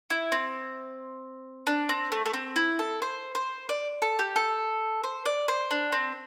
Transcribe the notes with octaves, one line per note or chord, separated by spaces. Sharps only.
E4
C4
D4
C4
A3
A3
C4
E4
A4
C5
C5
D5
A4
G4
A4
C5
D5
C5
D4
C4